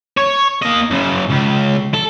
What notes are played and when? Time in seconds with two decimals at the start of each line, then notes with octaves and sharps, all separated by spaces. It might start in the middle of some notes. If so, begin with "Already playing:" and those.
0.17 C#5
0.62 A#3 D#5
0.90 F#2 C#3
1.30 C#2
1.94 A4